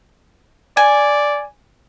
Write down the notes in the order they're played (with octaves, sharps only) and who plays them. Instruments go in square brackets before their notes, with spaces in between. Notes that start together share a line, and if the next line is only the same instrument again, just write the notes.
[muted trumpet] D5 [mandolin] G#5